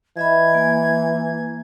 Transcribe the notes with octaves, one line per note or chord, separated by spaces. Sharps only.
E3 D#5 E5 B5 G#6
A#3 G#5